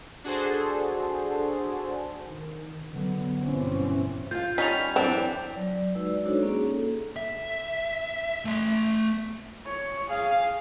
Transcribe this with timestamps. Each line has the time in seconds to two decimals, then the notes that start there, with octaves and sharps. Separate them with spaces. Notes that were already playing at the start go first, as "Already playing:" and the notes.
0.24 D4 F#4 G#4 A4 C5
2.25 D#3
2.91 D3 F#3 B3
3.41 G1 B2 E3 C4 C#4
4.31 F4 F5 G6
4.58 G3 C#4 D#4 B6 F7
4.96 F#2 E3 C4 D4 G5
5.54 F#3 D5
5.95 G#3 D#4 F#4 B4 D5 E6
6.26 D4 D#4 F#4 A4 C5 C#5
6.43 A#3 C#4 G#4
6.68 A4
7.16 E5
8.45 A3 C6
9.66 C#5
10.09 G#4 F5